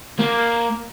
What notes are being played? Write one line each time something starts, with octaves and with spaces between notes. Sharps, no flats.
A#3